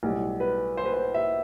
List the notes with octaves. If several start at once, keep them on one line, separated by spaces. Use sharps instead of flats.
B1 A2 G3
B4
C5
B4
C5
E5